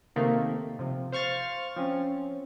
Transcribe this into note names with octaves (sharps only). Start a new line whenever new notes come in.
C3 D#3 A3 A#3
C3 F3
C5 F5 C#6 F6 A6
F3 C4 C#4